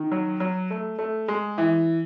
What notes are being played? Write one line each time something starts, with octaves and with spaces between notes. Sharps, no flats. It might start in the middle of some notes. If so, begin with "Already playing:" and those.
Already playing: D#3
F#3
F#3
A3
A3
G#3
E3